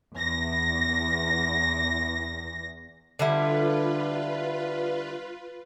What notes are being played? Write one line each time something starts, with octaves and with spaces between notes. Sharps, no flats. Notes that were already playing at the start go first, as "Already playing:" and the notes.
E2 A#6
D3 G3 E4 F4 B4